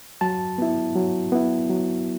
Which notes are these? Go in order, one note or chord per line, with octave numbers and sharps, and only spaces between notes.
F#3 A5
B3 E4
F#3
B3 E4
F#3